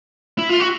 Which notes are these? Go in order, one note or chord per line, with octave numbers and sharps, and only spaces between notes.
E4
F4
F#4